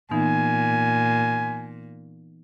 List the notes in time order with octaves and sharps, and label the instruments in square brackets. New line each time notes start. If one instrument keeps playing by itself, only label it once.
[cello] A#2 [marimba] E3 B3 D#4 [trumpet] G#5